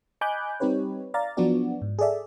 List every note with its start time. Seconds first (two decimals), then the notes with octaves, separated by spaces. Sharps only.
0.21 D#5 G#5 B5 D6 F#6 G6
0.60 G3 C4 D#4 G4 B4 C#5
1.14 D5 F5 A#5 A6
1.37 F3 F#3 B3 D4 F#4 D5
1.82 G#2
1.99 G#4 A4 D5 E5